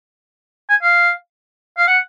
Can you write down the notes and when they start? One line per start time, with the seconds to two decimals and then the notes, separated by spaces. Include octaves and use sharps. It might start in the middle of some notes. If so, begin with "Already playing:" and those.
0.70 G#5
0.82 F5
1.78 F5
1.87 F#5